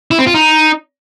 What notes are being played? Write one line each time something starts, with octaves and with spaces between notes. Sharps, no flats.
E4
C4
F4
D#4